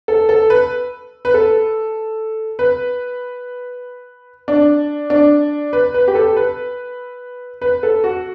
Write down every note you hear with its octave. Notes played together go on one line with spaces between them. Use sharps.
A4
A4
B4
B4
A4
B4
D4
D4
B4
B4
G4
A4
B4
B4
A4
F#4